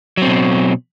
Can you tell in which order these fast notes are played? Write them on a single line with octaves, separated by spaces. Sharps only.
F#3 C4 B2